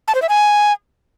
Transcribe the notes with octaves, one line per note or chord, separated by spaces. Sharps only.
A5
C5
E5
G#5